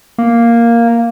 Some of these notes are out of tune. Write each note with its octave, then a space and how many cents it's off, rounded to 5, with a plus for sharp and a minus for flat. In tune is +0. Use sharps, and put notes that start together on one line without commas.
A#3 +0